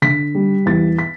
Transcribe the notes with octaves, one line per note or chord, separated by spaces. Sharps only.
D3 B6
G3
E2 A6
B6